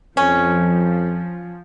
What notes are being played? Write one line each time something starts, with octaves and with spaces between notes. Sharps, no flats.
F2 F3 C#4